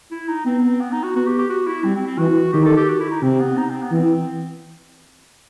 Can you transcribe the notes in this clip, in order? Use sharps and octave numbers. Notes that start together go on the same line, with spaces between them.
E4
D#4
B3 C4
B3
D#4
F#4
B3 F#4
G4
G4
F#4
E4
G3 C4
C4
C4
E3 F#4
D#3 G4
A4
G4
F#4
E4
D#4
C3 C4
B3
D#4
C4
B3
E3 C4